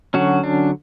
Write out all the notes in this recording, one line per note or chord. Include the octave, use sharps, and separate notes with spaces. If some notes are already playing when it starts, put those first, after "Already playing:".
D3 F#3 C#4 F#4
D4